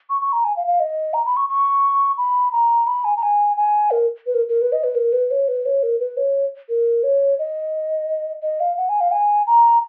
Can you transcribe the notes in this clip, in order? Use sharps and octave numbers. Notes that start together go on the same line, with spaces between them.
C#6
C#6
A#5
G#5
F5
F5
D#5
A#5
B5
C#6
C#6
B5
A#5
B5
G#5
A#5
G#5
G#5
A#4
B4
A#4
A#4
B4
D#5
B4
A#4
B4
C#5
B4
C#5
A#4
B4
C#5
A#4
C#5
D#5
D#5
F5
F#5
G#5
F5
G#5
A#5